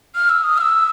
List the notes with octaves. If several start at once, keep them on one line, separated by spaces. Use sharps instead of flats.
F6
E6
D#6
F6
E6